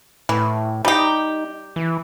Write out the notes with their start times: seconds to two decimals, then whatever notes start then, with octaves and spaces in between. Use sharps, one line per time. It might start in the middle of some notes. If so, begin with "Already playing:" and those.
0.29 A2 E3
0.85 G3 D#4 G4
1.76 E3